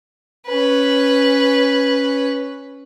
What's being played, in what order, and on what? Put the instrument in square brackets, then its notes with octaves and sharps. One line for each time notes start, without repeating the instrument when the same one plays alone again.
[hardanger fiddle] C#4 B4